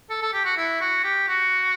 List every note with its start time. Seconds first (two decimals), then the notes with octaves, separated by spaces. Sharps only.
0.10 A4
0.22 A4
0.33 G4
0.44 F#4
0.57 E4
0.80 F#4
1.04 G4
1.28 F#4